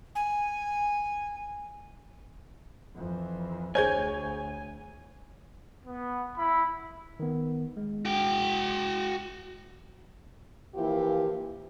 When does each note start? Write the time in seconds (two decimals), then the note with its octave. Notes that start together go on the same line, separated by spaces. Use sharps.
0.15 G#5
2.96 F2 E3
3.75 D2 G#4 C5 C#5 G#5 G6 G#6
5.86 B3
6.37 E4 B5
7.20 D#3 B3
7.77 G#3
8.05 F#4 G5
10.75 E3 F3 A#3 E4 G4